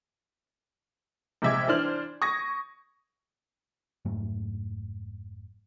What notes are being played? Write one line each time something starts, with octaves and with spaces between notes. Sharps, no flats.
A#1 C3 G#3 E5 D6 G#6
E3 D4 C5 F6 F#7
C#6 D#6 G#6 A#6
F1 G#2 F#3 A3